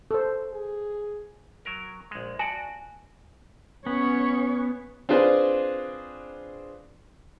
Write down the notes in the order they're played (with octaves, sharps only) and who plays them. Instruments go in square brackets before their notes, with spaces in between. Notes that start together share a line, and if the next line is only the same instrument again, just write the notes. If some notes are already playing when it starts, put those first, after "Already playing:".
[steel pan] A4 C5
[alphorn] G#4
[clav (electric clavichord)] F#3 A#4
A#1 G#3
[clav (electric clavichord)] F#4 D5 [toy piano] G#5 A5
[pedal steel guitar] B3 [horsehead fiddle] C#4 C#5
[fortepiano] C4 D4 F4 G#4 B4 C5